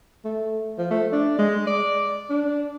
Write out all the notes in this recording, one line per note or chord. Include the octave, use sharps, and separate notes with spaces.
A3
F3
A3
D4
G#3
D5
D4